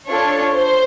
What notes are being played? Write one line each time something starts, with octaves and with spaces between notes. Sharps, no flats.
D4 F4 A4 C#5
C5